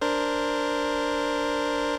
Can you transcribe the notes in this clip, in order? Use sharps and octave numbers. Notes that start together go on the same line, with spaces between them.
D4 A#4 C5